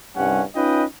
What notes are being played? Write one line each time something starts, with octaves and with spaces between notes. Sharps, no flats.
C2 G2 G3 C#4 F#5
C#4 D#4 F4 B4 D#5 G5